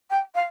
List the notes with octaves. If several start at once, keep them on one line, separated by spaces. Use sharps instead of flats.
G5
F5